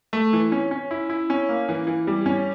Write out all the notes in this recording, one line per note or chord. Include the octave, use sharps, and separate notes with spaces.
A3
E3
C#4
C#4
E4
E4
C#4
A#3
E3
E3
G3
C#4